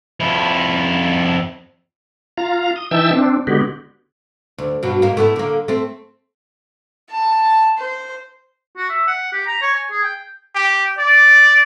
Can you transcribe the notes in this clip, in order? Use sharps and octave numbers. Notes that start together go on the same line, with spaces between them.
F2 E4
F4 F5 A#5
D#6
E3 D#4 E5 G5 A5 E6
C4 D4
D3 G#3 B3 F#4 G4
D2
G2 B2 F#3
G#2 A#3
A3 B3 E4
D3 A#3
A3 C4
A5
C5
F#4
E5
F#5
G4
A#5
C#5
G#5
G#4
G5
G4
D5